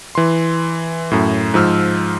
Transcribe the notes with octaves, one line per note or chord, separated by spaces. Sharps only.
E3 C6
F#2 A2
G#2 F3 E6 F6